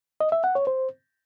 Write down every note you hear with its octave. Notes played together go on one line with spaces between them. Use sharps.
D#5
E5
F#5
C#5
C5